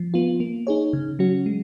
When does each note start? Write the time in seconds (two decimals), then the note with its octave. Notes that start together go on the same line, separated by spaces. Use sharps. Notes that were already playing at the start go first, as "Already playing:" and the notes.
Already playing: F3
0.14 B3 F4
0.40 A#3
0.67 D#4 G#4 C#5
0.93 C#3
1.19 F#3 C#4 F#4
1.46 G#3